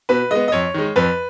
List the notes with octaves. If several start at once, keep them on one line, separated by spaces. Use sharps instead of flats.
B2 B4
G#3 B3 D#5
D#5
F2 C#5
D#3 G#3
F2 B4